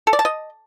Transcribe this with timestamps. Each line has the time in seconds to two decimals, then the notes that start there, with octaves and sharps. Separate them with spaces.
0.07 A4
0.13 D5
0.19 A5
0.25 D#5